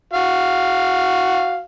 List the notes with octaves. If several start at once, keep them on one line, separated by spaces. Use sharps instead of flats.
F#4 F5